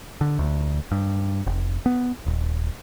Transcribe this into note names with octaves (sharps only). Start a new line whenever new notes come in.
D3
D2
G2
F1
B3
D#1